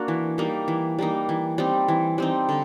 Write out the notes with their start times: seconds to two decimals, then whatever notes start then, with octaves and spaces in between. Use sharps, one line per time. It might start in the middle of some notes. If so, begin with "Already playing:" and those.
Already playing: A#3 D4 F#4
0.08 E3
0.38 G3 A#3 D#4
0.68 E3
0.98 G3 A#3 D#4
1.29 E3
1.58 G3 C4 D#4
1.88 E3
2.18 G3 C4 D#4
2.49 D3